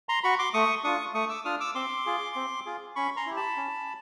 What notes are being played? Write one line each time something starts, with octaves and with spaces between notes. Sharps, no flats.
A#5 C6
F#4 B5 C#6
C6 D6
A3 C#6 D#6
D4 F4 C#6 D#6
A3 C#6 D#6
D6 E6
D4 F4 D#6 F6
D6 E6
C4 C6 D6
F4 G#4
C4
F4 G#4
C#4 B5 C#6
A#5 C6
E4 G4
A5 B5
C#4